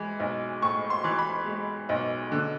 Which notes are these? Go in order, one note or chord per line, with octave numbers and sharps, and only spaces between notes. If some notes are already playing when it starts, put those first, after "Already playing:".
Already playing: E3 G#3
B1
A2 C#6
C6
E3
B5
G#3
B1
D3